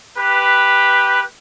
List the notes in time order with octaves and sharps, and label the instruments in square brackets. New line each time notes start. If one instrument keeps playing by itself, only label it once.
[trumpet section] G4 B4